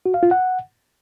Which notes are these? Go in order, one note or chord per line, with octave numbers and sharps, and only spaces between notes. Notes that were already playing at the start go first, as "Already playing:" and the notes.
F#4
F5
F4
F#5